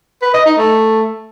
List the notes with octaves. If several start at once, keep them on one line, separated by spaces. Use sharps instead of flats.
B4
D#5
D#4
A3